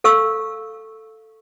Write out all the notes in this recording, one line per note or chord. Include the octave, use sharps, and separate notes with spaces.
A4 F5 C#6 E6